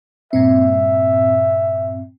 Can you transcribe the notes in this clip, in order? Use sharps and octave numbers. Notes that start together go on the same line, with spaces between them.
G2 A#2 C4 E5